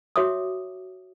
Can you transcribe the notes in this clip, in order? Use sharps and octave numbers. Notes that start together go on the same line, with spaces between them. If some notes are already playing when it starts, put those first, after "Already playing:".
F#4 C#5 E5 D6 D#6